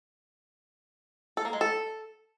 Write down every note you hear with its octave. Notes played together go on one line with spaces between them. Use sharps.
A4
A#3
G#3
A4